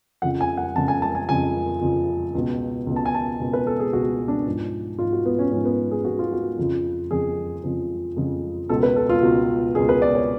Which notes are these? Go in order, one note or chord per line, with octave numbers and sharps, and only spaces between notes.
F2 C#3 F3 F#5
G#5
F#5
F2 C#3 F3 A5
G#5
A5
G#5
F2 C#3 F3 G#5
F2 C#3 F3
C#2 B2
C#2 B2
A5
G#5
A5
C#2 B2
B4
A4
G#4
C#2 B2 F#4
D4
G#2 F3
G#2 F3 F4
F#4
B3
C#4
G#2 F3 C#4
B3
G#4
G#2 F3 F#4
F4
F#4
F2 C#3 F3
F2 C#3 F3 G#4
F2 C#3 F3
F2 C#3 F3
C#2 B2 A4
B4
A4
F4
C#2 B2 F#4
C#2 B2 G#4
B4
D5
C#5